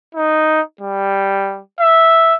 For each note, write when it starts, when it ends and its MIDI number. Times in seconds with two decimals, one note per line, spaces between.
0.15 0.61 63
0.81 1.61 55
1.80 2.35 76